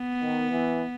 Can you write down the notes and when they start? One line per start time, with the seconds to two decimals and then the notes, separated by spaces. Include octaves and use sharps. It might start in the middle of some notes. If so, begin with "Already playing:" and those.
Already playing: B3
0.21 D#3
0.51 E3